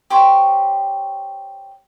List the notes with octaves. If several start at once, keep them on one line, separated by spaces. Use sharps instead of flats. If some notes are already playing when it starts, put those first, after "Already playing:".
G4 C5 C#5